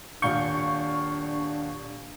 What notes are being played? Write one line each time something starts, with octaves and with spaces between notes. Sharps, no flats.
D#1 D4 F5 C#6 G6